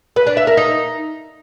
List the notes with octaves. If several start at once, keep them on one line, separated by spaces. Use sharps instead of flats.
B4
D4
E5
A#4
D#4